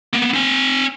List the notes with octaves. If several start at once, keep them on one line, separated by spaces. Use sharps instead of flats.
A#3 B3
C4 G#5